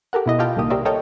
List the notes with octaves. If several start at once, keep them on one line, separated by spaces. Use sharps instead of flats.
G4 A4 A#4 F#5
B2 E4 D#5
E4 F4 G4 F5 G5 A5
C2 A#2 D#3 A#3 G4 D#6
G4 A#4 C5 D5 E5
A4 A#4 C#5 D#5 G5 A5